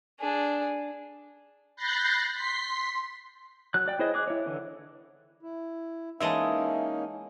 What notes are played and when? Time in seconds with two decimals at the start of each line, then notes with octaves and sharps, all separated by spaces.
0.20 D4 G#4
1.76 B5 F#6 G6 A6 A#6 C7
2.34 C6 B6 C7
3.74 F#3 F#6
3.88 D5 G5
3.99 E4 G#4 C5 C#5 D#5
4.14 G#4 D6 F#6
4.28 E4 C#5
4.46 D3 E3
5.42 E4
6.20 E3 G#3 A#3 C#4 D#4 D#5 E5 A5